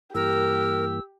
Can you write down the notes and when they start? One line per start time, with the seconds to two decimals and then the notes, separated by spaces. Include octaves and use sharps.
0.15 G2 E3 A#3 G4 A#4 E6